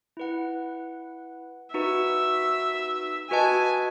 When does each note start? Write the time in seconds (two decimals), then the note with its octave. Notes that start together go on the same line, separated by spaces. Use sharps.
0.17 E4 B4 F#5
1.74 D#4 F#4 B4 E5
3.31 F#4 B4 D#5 G#5 A5